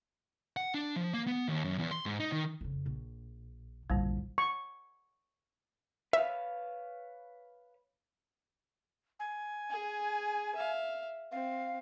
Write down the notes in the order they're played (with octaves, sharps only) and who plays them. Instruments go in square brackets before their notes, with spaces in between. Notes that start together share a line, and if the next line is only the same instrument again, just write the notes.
[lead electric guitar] F#5
D4
F3
A#3
B3
D#2
F#2
E2
C6
G#2
D#4
D#3
[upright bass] F2 C#3
A#1
[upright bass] A#1 E2 [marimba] G2 D3 G3
[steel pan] C#6
[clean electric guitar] B4 C#5 F5 [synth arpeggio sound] E5
[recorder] G#5
[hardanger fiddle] G#4
E5 F5
[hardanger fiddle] C4 [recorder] F5